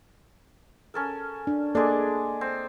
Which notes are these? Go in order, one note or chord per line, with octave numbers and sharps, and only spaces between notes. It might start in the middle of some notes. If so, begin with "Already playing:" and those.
C#4 A4 A#4
D4
G#3 A#3 D4 A4 D5
C4